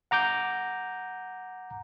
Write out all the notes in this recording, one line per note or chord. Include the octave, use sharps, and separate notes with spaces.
F#5 A#5 D6 G6